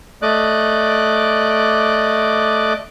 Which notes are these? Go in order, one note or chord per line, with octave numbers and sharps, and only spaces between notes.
A3 D5 D#5 D6 F#6